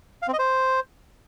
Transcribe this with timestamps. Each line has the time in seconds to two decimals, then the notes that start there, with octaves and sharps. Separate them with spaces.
0.22 F5
0.28 C4
0.33 D#5
0.39 C5